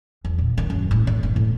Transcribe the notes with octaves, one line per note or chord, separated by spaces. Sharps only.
E2
A#2
D#3
F#2
A2
A3
G2
A2